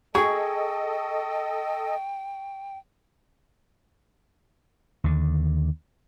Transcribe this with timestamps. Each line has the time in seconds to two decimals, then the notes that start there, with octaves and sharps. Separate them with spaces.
0.15 G#4 A4 D#5 G5 C#6
5.04 D#2 D3